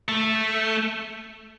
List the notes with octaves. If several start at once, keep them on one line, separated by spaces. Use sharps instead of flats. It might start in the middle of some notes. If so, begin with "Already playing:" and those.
A3